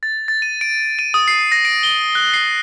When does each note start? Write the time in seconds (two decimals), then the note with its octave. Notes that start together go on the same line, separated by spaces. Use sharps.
0.03 A6
0.28 A6
0.42 D#7
0.61 D7
0.99 D#7
1.14 D#6
1.28 C7
1.52 A#6
1.65 D7
1.83 G7
2.15 F#6
2.34 C7